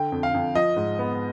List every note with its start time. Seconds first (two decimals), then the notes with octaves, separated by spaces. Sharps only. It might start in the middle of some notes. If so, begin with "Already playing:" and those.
Already playing: D3 G5
0.12 F2
0.23 F5
0.34 F2
0.55 F3 D#5
0.77 G#2
0.99 B3